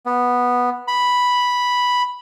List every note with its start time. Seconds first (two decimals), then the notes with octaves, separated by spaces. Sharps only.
0.06 B3
0.88 B5